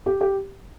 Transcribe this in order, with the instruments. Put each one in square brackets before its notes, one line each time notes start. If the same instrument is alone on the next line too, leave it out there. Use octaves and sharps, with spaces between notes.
[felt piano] G4
G4